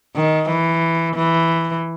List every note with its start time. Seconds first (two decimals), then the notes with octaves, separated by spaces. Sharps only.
0.15 D#3
0.49 E3
1.15 E3